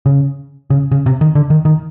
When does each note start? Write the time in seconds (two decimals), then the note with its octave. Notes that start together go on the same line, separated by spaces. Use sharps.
0.06 C#3
0.70 C#3
0.91 C#3
1.06 C3
1.21 D#3
1.35 D3
1.50 D#3
1.65 D#3